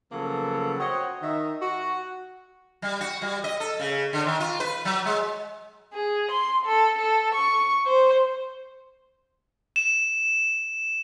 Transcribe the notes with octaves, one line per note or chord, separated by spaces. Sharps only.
C#3 F3 F#3 A#3 B3 A4
F#4 C5 C#5 D#5 F#5 G5
D#3 D#4 E5
F#4
G3
F#4
G3
D#5
A4
C#3
D3
D#3
F4
B4
F#3
G#3
G#4
C6
A4
A4
C#6
C5
E7